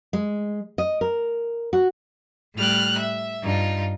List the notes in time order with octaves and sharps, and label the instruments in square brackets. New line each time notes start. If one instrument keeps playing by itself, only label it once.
[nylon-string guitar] G#3
D#5
A#4
F#4
[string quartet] A2 G3 F6 F#6
E5
G2 D#4 F4